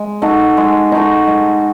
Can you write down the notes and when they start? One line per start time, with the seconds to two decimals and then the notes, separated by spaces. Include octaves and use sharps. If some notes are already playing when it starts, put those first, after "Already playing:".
Already playing: G#3
0.22 D#4 F#4 A4
0.57 G#3
0.92 D#4 F#4 A4
1.27 G#3